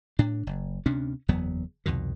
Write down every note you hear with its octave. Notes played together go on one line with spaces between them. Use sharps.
A2 D4
F#1
D2 C3 C#4 D4
F#1 E2 F#3 B3
C2 F2 B2 D#3